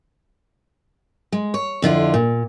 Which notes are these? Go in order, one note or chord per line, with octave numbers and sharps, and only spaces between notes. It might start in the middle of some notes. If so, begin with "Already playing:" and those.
G#3
C#5
F2 D3 E4 F4
A#2